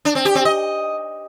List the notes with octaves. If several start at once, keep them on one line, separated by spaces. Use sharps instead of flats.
D4
C4
G4
C4
D#5